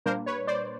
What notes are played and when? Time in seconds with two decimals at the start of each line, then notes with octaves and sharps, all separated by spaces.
0.06 A#2 G3 A#3 D4 A#4 C5
0.26 B4 C#5
0.47 C5 D5